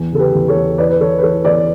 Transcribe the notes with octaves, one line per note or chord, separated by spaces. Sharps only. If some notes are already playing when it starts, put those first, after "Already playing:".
Already playing: E2
C#3 A4
G4 B4
E2
A4 C#5
E2
E3 B4 D5
B4
E2 A4 C#5
B4
E3 A4 C#5
E2 B4 D5